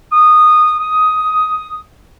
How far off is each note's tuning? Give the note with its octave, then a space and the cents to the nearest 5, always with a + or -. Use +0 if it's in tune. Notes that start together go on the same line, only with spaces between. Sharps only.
D#6 -15
D#6 +10